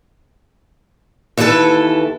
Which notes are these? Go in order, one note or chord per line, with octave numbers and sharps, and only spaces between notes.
D#2 E3 E4 G#4 A4 B4